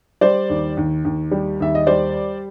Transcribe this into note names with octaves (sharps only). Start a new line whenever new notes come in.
G3 C5 D5
D#2
D#2
D#2
G3
D#2 E5
D#5
G3 C5 D5